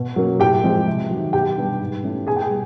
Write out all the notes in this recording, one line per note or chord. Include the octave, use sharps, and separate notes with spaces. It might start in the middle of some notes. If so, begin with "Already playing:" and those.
Already playing: B2
F#3 A#3 C#4
A2 G4 G5
F3 G#3 C4
C3
D#3 F#3
B2 G4 G5
G3 B3 D4
G#2
E3 A3 C#4
B2 G#4 G#5
G5
G#4 G#5
G3 B3